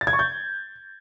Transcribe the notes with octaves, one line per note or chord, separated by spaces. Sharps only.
A6
G#6
C#6
G6